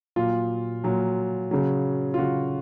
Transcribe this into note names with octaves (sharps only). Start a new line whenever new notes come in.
A#2 F#3 F4
A#2 F#3
C#3 F#3
F4
C#3 F#3 F#4